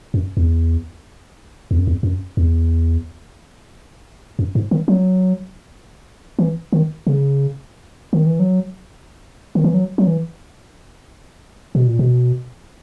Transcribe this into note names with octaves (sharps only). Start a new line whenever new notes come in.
F#2
E2
E2
F#2
E2
F#2
E2
F#2
G#2
D#3
F#3
E3
D#3
C#3
D#3
E3
F#3
D#3
E3
F#3
F#3
E3
B2
A#2
B2